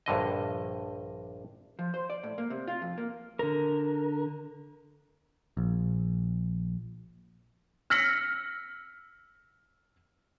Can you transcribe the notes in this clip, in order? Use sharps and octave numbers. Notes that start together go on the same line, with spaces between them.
A#1 G2 D3 D#5
F3
C5
D5
A2
A#3
C3
F4
F2
A#3
D3 A#4
A#1
E6 F6 A#6 B6 C#7 F#7